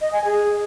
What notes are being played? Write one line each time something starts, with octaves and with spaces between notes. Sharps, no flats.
D#5
G#5
G#4